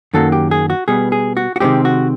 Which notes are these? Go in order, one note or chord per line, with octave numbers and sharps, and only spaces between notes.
F#2 D#3 F#3 A#3 A4
G4
G#4
F#4
B2 G3 B3 G#4
G#4
F#4
F#4
C3 D#3 G#3 C4 G4
F#4